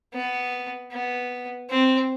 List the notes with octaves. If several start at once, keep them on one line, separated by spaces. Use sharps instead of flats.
B3
B3
C4